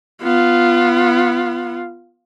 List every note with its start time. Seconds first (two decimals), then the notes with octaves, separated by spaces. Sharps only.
0.23 B3 F4